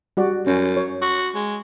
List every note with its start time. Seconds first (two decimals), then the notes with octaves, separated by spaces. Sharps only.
0.17 G3 F#4 D5
0.47 F#2 C#4
0.77 C#5
1.02 F#4
1.35 G#3